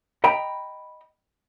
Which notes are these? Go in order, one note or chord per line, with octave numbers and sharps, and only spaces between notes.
D#5 G5 A#5 B5